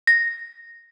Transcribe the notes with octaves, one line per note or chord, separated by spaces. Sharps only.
A#6